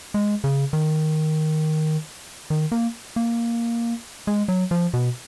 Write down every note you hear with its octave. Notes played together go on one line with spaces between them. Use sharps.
G#3
C#3
D#3
D#3
A#3
A#3
G#3
F#3
F3
B2